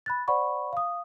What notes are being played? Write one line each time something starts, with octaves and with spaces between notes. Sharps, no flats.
B5 F#6 A6
C5 D5 F#5 B5 C#6
F5 D#6